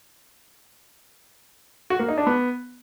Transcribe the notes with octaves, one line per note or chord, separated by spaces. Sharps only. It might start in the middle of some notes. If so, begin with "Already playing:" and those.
F#4
A#3
D#4
D4
B3